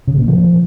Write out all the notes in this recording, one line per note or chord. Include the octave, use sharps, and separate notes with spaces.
C#3
A#2
F3